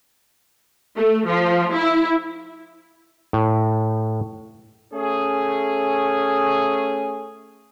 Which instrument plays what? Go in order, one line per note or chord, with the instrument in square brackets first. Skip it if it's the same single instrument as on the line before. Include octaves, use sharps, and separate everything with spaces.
[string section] A3
F3
E4
[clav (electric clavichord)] A2
[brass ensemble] A3 C#4 G#4